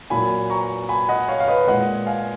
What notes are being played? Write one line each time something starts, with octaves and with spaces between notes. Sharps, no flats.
A#2 F#3 G#5 B5
A#5 C#6
G#5 B5
D#5 F#5
C#5 F5
F5
B4 D#5
A#2 G#3 D#5 F#5
F5 G#5